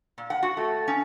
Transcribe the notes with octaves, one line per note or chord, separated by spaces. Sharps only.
A#2
F#5
F#4
A3
C#4